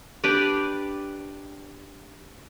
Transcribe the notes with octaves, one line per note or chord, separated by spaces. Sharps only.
D4 G4 B4 D5